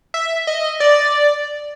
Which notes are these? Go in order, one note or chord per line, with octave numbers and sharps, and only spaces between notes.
E5
D#5
D5